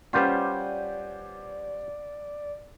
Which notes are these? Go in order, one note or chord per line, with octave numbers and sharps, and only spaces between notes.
G3 C#4 F4 B4 C5 D5 F#5 G6